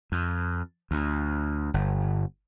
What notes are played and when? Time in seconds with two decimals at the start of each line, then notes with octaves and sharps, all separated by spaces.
0.12 F2
0.91 D2
1.74 G1